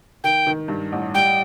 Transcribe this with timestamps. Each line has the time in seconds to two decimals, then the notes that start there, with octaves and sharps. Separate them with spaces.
0.24 D#3 G5
0.47 D#3
0.68 G2
0.92 A1
1.14 G3 G5